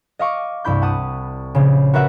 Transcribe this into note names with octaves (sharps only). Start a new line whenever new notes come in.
D#5 F5 C#6 D6
C2 G2 E4 B5 G6
F#5 A5 D#6
A#1 C#3
F#4 A#4 B4 E5 F#5